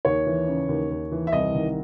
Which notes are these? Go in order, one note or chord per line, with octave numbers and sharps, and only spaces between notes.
D#2 C#5
E3
C#3
D#2
D#2
E3
E5
C2 D#5
D#3